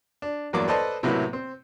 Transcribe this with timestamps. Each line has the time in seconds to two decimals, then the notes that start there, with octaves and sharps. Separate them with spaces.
0.22 D4
0.53 E2 G2 F#3 A#3 D4 D6
0.68 A4 B4 C5 D5 D#5 A5
1.03 A2 C3 F#3 A#3 B3 E4
1.33 C4